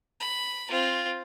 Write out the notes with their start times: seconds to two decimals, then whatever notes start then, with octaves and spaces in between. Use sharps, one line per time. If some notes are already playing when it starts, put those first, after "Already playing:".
0.20 B5
0.69 C4 F4